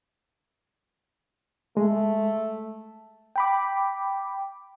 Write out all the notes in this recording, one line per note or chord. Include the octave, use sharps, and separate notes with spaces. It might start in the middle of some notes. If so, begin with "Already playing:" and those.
G#3 A3
G5 B5 D6